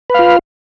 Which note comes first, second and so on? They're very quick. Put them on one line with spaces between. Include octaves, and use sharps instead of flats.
B4 F5 F4